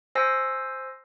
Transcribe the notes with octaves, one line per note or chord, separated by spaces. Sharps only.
C5 G#5 E6 A#6 C7